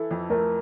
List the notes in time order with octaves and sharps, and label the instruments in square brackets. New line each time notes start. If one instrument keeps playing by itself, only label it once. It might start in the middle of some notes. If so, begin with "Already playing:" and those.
Already playing: [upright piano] E3 E4 [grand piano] A4
[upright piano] F2
[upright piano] A3 [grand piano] A#4